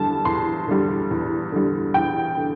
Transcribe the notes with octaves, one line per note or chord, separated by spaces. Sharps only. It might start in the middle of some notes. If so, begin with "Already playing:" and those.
Already playing: E2 D3 G3 A5
E2 C6
D3 G3
E2
D3 G3
E2 G5
D3